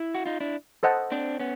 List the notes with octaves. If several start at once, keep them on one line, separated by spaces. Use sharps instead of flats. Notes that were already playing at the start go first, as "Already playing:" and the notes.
Already playing: E4
F#4
D#4 F4
D4 E4
A4 C5 D#5 F#5 A5
C4 D4
B3 C#4